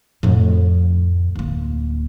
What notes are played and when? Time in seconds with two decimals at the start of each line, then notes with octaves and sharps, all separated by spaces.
0.23 F2 A2
1.36 D1 A#3